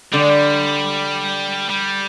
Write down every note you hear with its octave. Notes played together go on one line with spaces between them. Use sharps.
D3 G3
G#3
G3
G3